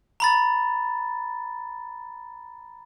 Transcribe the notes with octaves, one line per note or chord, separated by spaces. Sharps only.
A#5 B5 A6